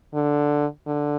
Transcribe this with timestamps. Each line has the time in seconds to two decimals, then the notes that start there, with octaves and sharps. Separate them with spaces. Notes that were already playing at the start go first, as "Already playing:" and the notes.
0.15 D3
0.87 D3